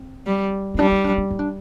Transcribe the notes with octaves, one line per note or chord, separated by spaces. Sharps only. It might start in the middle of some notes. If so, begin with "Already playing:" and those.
Already playing: C4
G3
C4
G3 D4
D#4
D4
D4
D#4
D4